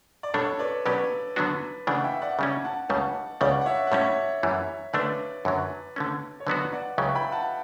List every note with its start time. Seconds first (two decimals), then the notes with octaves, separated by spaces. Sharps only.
0.23 D5
0.34 B2 G3 D4 A4 C#5
0.59 B4 D5
0.85 B2 F#3 C#4 G4 B4 D5
1.36 D3 F#3 B3 D4 F#4
1.87 C#3 E3 A3 D4 D5 F#5
2.04 E5 G5
2.22 D5 F#5
2.39 C#3 G3 C#4 D5 F#5
2.64 F#5 A5
2.89 C#2 C#3 G3 F#5 A5
3.41 C#2 C#3 G3 D5 F#5
3.61 F#5
3.66 C#5 E5
3.87 F#5
3.91 A2 G3 C#4 C#5 E5
4.43 F#2 E3 G3
4.93 D3 A3 D4 B4 D5
5.45 F#2 D3 F#3
5.96 D3 A3 C#4
6.40 C#5
6.46 D3 F#3 B3 F#4 B4 D5
6.72 D5 F#5
6.98 C#2 C#3 F#3 C#4 E5 G5
7.15 G5 B5
7.32 F#5 A5